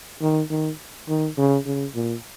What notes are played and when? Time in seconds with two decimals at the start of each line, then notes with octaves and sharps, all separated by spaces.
0.21 D#3
0.50 D#3
1.08 D#3
1.37 C#3
1.66 C#3
1.95 A#2